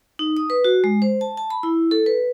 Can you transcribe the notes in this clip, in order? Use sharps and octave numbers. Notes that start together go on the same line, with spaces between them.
D#4
D#6
B4
F#4
G#3
C5
A5
A5
B5
E4
A4
B4